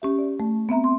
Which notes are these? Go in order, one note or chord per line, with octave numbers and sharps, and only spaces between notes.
C#4 G4 E5
D5
A3
B3 C4 E5 A#5
C6